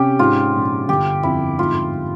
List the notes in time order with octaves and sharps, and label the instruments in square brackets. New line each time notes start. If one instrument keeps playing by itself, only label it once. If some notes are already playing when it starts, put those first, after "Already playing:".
Already playing: [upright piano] C3 C#4 [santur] G4
[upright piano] G#2 [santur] F4
[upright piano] A#1
[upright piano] G1 [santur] G4
[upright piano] F2 [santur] E4
[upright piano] G#2 [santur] F4